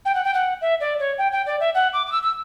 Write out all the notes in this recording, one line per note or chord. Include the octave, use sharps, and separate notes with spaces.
G5
F#5
G5
F#5
E5
D5
C#5
G5
G5
D5
E5
F#5
D6
D6
E6
E6